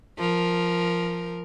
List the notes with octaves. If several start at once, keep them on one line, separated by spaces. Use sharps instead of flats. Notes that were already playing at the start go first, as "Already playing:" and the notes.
F3 A#4